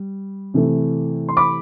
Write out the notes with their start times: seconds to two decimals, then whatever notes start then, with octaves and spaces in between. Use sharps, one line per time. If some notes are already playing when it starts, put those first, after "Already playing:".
Already playing: G3
0.54 C3 E3 A3
1.29 C6
1.37 B5 D6